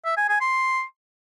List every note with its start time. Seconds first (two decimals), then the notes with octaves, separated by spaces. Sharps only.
0.05 E5
0.17 G#5
0.29 G#5
0.41 C6